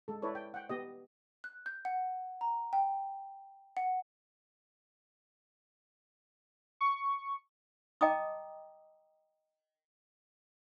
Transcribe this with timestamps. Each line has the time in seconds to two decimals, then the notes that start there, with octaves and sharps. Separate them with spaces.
0.08 G#3 A4
0.22 E4 A4 B4 C#5 D5
0.35 G5
0.54 F#5 G5
0.69 B3 G4 D#5
1.44 F#6
1.66 G6
1.85 F#5
2.41 A#5
2.73 G5
3.77 F#5
6.81 C#6
8.01 D#5 G5 A5 A#5 D6 D#6